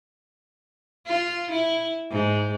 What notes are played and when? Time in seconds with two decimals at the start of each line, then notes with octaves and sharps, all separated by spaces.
1.07 F4
1.51 E4
2.11 G#2